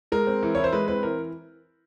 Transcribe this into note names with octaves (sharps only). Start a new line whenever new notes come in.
G#3 A#4
C4
E3
E4 C#5
C5
G#3 B4
C4 B4
E3 A#4